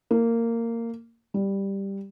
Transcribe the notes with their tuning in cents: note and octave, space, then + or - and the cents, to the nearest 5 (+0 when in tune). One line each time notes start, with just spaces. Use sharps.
A#3 -15
G3 +5